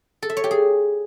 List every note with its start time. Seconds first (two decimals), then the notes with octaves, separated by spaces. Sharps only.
0.22 A4
0.30 E5
0.37 C#5
0.44 G4
0.51 G#4